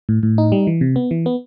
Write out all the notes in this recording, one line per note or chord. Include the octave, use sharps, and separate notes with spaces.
A2
A2
D#4
G3
E3
C3
B3
E3
B3